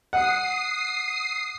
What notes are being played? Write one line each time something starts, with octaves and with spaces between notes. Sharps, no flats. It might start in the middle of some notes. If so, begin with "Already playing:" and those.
F#5 D#6 C7